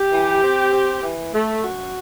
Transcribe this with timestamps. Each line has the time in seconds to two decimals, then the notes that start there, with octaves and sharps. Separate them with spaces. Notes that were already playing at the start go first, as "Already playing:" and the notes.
Already playing: G4
0.12 E3
0.43 C4
0.72 C4
1.02 E3
1.33 A3
1.63 F#2 F#4